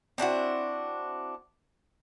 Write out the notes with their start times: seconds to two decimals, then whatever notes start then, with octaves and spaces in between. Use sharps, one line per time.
0.18 C4 D4 E4 F#4